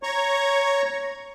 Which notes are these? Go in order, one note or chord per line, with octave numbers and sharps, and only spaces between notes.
C#5 A#5 C#6